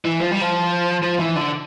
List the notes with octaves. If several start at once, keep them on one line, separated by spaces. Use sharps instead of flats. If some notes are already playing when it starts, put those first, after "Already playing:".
E3
F3
G3
F3
F3
E3
D3